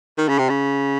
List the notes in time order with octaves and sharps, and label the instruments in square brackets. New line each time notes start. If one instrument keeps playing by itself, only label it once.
[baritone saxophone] D#3
C#3
C3
C#3